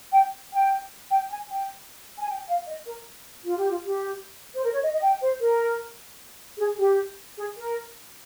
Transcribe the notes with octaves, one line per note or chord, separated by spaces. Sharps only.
G5
G5
G5
G#5
G5
G#5
G5
F5
D#5
A#4
F4
G4
F4
G4
C5
A#4
C#5
D#5
D#5
G5
C5
A#4
G#4
G4
G#4
A#4